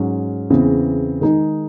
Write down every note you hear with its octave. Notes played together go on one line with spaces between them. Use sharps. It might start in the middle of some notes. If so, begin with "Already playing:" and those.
Already playing: G#2 F#3 C#4
E2 C#3 E3 C4
D#3 G#3 D#4 G#4